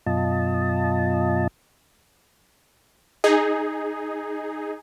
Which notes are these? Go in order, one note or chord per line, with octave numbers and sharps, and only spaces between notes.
F#2 B2 F4 D#5 A5
D#4 G#4